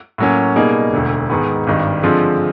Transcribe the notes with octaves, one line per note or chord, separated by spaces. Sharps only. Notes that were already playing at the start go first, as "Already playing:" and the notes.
A2 F#3 A#3 C#4
B2 G3 A#3 D#4 G#4
E1 D2 D3
G#2 D#3 G#3 B3
G#1 G2 D#3 G3
D3 F3 G#3 C4 F4